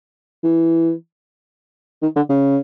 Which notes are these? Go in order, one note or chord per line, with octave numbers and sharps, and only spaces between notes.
E3
D#3
D3
C#3